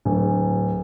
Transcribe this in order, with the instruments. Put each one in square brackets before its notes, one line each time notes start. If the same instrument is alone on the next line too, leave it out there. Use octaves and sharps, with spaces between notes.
[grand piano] D1